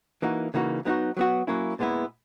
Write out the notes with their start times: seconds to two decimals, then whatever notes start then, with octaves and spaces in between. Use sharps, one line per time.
0.22 E3 A#3 D#4 F#4
0.54 C#3 E3 A#3 D#4 F#4
0.85 F#3 B3 D#4 F#4
1.17 F#3 B3 F#4
1.47 F#3 A#3 C#4 E4
1.79 A#2 G#3 B3 E4